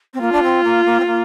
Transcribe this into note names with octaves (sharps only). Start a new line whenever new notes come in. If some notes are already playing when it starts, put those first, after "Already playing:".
C4
A#3 F4
D4
C4
A#3
A#3
C4
A#3